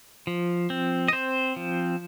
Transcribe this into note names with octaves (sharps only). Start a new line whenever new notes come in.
F3
C4
D#5
C4 C5
F3